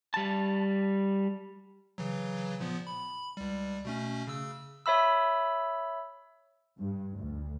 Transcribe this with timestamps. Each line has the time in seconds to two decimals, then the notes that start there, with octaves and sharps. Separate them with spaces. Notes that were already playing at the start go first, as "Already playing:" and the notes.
0.14 G3 A5
1.98 C#3 E3 F#3
2.60 A#2 F3 B3
2.87 B5
3.37 C#2 G3
3.85 B2 A3 C#4
4.27 C#3 E6
4.86 C#5 E5 B5 E6
6.78 G2
7.18 D2